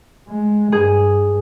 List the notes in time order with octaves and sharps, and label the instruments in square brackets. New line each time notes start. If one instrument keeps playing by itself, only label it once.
[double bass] G#3
[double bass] G2 [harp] G#4